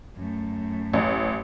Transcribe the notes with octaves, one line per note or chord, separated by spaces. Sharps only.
F#2 A3
A1